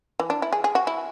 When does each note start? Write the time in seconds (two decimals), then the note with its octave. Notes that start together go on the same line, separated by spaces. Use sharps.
0.20 E3
0.30 D4
0.42 E4
0.53 G#4
0.64 G#4
0.75 F#4
0.87 E4